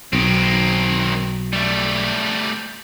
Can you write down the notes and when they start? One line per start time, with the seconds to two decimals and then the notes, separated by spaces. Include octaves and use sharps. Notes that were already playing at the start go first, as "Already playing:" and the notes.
0.13 B1 D#3 C4
1.53 G3 A3